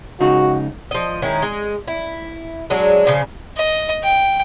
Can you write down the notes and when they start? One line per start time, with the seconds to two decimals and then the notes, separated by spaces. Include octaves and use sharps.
0.20 C#2 C#3 D#4 F#4
0.91 F3 D#5
1.22 D#3 G#3 C#4 E4
1.42 G#3
1.88 E4
2.70 F#3 G#3 D4
3.05 C#3 F3 D4
3.57 D#5
4.03 G5